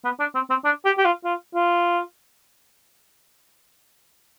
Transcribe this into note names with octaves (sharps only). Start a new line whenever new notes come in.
B3
D4
C4
C4
D4
G4
G4
F4
F4
F4